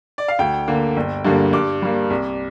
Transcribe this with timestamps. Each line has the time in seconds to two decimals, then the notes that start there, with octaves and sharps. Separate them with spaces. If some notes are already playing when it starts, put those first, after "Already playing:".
0.18 D5
0.28 F5
0.39 D2 G5
0.68 D3 A#3
0.96 G1
1.25 G2 D3 G3 A#3
1.53 G2 D6
1.82 G3 A#3
2.10 C2